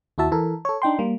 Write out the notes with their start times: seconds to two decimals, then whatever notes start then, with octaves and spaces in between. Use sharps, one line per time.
0.18 D#2 E4 F#4 E5 A5
0.32 E3 A4 A#4
0.65 A4 C#5
0.82 D4 D#4 G5 C6
0.99 G3 A#3